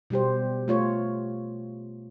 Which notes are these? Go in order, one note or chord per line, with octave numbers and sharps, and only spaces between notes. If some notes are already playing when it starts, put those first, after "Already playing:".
B2 G3 G4 C5
A3 F4 C#5